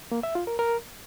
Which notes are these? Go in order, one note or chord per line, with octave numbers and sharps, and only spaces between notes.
A#3
E5
F4
A#4
A#4